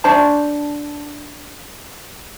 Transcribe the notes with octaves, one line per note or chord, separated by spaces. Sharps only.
D4 C5 A5